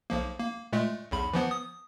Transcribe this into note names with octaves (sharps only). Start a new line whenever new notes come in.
B1 F3 A#3
A#3
A#2 G#3 A3
B1 E2 B5
E3 F3 B3
D#6